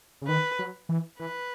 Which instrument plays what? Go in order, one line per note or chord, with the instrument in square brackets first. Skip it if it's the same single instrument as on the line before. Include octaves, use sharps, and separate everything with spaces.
[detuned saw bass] C#3
[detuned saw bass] D#3 [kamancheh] B4
[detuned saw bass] F#3
E3
[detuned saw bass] E3 [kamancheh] B4